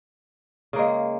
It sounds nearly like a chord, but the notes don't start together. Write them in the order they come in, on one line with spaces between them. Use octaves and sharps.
C#3 A#3 G#3